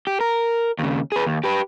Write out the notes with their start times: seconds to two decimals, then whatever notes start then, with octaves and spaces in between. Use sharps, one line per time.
0.07 G4
0.21 A#4
0.79 D#2 C#3
1.12 G#4 B4
1.26 D#2
1.44 G4 B4